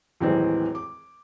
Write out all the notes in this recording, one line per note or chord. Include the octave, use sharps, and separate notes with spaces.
D#2 A2 E3 F#3 G#3 C4
D6